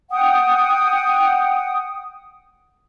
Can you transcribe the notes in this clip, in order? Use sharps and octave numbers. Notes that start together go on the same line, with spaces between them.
F#5 G5 D#6